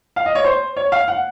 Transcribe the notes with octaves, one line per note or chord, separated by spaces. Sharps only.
F5
D#5
C#5
C5
C#5
F5
F#5